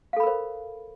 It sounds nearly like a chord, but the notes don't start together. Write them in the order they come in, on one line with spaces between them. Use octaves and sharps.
F5 A4 B5 A#4 C5